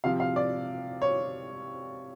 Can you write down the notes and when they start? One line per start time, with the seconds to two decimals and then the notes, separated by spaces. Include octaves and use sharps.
0.04 C3 F3 F5
0.20 F5
0.36 D5
1.02 C#5